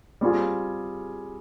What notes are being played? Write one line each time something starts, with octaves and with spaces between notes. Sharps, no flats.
G3 C4 F4 G#4